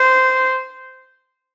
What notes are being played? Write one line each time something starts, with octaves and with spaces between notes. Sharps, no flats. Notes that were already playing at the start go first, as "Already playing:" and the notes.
Already playing: C5